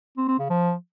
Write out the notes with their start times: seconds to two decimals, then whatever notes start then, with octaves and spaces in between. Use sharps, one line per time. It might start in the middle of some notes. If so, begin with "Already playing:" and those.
0.18 C4
0.28 C4
0.39 C#3
0.50 F3